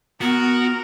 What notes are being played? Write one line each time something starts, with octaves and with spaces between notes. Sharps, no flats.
B3 F#4 A#4